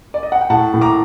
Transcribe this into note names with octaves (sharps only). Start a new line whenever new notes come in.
D5
D#5
F#5
G5
A2 F#5 A5
A2
A#5 D6